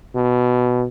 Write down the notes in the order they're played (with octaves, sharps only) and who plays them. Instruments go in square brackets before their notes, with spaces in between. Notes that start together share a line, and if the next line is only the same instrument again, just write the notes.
[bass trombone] B2